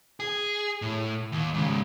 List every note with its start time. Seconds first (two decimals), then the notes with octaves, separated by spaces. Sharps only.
0.20 G#4
0.82 A2
1.32 D#2
1.54 G#2 C#3